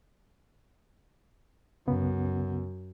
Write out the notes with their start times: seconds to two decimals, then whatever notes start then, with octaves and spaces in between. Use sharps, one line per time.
1.87 C2 F#2 C#3 B3